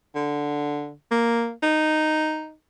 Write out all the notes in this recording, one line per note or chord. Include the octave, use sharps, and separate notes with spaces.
D3
A#3
D#4